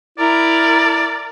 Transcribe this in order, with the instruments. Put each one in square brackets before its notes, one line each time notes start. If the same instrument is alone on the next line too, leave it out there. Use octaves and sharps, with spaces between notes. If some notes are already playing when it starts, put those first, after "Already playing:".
[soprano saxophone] E4 [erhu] A#4 [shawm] D5